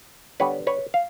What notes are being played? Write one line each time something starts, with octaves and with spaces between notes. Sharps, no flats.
D3 G3 B3 B4 C#5
B4 C#5
F5